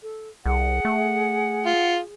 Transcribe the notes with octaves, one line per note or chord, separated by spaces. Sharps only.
A4
C2 G#4 F#5
A3
F4